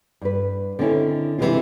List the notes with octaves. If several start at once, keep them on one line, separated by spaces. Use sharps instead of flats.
G2 B4
D3 D#3 C4 C#4 E4
C3 E3 F3 G#3 C#4 F4